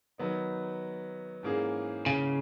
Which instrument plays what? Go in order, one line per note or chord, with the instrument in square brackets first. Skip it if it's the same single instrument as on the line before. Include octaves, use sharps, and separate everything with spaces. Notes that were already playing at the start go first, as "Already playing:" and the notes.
[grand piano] D#3 F#3 B3 D#4
G#2 E3 A#3 C#4 G#4
[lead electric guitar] C#3